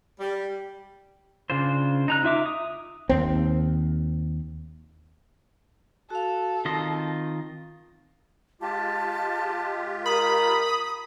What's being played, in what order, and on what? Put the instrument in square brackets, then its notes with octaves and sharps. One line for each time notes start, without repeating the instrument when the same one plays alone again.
[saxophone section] G3
[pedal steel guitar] C#3 D4 F4 C5
D#4 A#5 F#6
D#4 F4 E5 D6
D#6
[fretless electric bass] D#2 C4
[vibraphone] F#4 F5 [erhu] A4
[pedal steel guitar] D#3 F4 D#5 [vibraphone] C4
[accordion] G#3 F4 G4 [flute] A5
[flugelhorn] A#4 [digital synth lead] B5 [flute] D#6